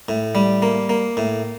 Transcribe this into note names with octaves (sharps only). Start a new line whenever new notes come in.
A2
G3
A#3
A#3
A2